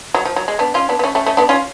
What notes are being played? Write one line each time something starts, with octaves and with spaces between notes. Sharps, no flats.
F#3
F3
F#3
G#3
B3 D4
C#4 F4
B3 D4
B3
A3 C#4
A3 C#4
A3 C#4
B3 D4
C#4 F4